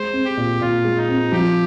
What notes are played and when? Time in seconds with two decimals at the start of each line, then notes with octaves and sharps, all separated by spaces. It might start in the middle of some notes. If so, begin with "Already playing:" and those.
Already playing: G#3 C5
0.13 C4
0.25 G4
0.37 A#2
0.61 A#2 F4
0.85 G#3
0.97 D#4
1.08 C4
1.32 F3 G4